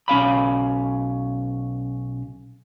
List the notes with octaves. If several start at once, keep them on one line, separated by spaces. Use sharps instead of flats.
B1 C#4 F5 B5